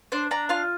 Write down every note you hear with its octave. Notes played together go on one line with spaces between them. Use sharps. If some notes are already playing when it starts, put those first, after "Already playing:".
D4 C5
D4 A#5
F4 F5